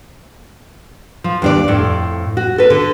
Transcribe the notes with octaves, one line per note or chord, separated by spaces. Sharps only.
F3
D#2 D4 D5
F2 A2
F#4
A4 B4
D3